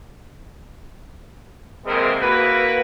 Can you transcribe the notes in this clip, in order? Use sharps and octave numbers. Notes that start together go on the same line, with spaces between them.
C3 E3 G#3 A#3 C4 A#4
A#3 E4 F#4 B4